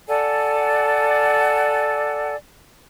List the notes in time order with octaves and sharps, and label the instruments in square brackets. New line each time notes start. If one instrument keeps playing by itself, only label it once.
[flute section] A4 D5 F#5 G#5